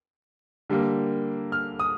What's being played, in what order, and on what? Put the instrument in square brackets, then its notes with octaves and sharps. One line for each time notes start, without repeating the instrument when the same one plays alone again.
[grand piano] D3 G3 A#3
F6
D#6